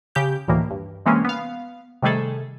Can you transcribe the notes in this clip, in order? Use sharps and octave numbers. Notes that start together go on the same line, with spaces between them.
C#3 G4 G6
D2 A2 D#3 E3 A#3
G2
C3 E3 G#3 A#3 C4 C#4
B3 F5
C3 D#3 G3 A3 G#4 A4